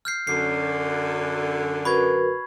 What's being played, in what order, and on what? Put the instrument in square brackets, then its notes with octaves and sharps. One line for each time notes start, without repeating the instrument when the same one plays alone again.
[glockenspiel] F6 G6 C7
[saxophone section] F#2 D3 [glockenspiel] C7
[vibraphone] F#4 A#4 B4 [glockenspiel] B5 C#6 G#6